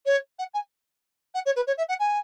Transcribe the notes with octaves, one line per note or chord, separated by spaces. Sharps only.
C#5
F#5
G#5
F#5
C#5
B4
C#5
E5
F#5
G#5